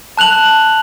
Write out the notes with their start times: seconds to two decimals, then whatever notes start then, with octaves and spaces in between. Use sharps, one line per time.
0.17 A5 F#6 F7 F#7